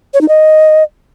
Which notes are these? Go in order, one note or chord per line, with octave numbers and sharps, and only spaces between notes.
C#5
D#4
D#5